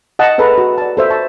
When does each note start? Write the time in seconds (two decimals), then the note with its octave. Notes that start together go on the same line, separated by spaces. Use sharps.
0.19 D#5 F#5 A5
0.38 G#4 A4 B4 E5 A5 A#5
0.58 F#4
0.78 D5 A5
0.97 A4 C5 E5
1.10 A5 C#6